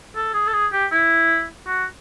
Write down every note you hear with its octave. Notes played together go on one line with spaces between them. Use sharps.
A4
G#4
A4
G#4
G4
E4
F#4